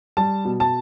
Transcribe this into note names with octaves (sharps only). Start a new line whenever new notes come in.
G3 A5
B2
A5